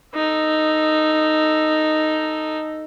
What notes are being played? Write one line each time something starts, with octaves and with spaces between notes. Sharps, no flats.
D#4 A4